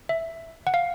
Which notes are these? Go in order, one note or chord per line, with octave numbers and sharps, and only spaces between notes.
E5
F#5
F5